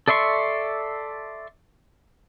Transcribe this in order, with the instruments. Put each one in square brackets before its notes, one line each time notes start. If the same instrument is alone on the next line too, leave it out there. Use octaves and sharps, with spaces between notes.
[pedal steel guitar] A4 D5 E5 C6 C#6